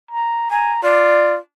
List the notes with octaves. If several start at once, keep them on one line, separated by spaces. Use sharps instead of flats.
A#5
G#5 A#5
F4 D5